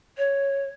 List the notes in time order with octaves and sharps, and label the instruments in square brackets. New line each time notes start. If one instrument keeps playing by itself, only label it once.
[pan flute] C#5